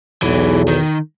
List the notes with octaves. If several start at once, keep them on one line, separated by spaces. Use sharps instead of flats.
B1 E2 E3 F#3
D#3